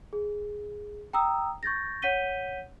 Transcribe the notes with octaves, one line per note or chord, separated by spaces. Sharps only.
G#4
G5 A#5 D#6 E6
C#6 G6 A6 A#6
C#5 F#5 G6 B6 D#7 G7